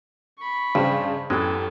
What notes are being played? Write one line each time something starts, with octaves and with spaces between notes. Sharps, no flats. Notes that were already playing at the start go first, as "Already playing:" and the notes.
B5 C#6
G2 C#3 C5
F#2 E3 G#3 G4 A4